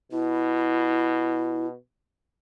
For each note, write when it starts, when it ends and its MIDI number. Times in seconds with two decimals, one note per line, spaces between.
0.12 1.75 47
0.12 1.67 64